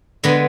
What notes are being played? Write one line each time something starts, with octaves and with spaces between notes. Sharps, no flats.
D3 G#3 B3